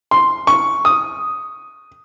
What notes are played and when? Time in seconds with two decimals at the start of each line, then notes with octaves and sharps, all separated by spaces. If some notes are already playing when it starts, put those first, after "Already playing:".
0.11 C6
0.47 C#6
0.85 D#6